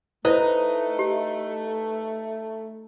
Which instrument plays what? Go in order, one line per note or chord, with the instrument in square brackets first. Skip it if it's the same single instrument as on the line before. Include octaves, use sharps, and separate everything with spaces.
[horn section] A3 [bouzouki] D#4 [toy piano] E4 C5 [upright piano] B4
[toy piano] G4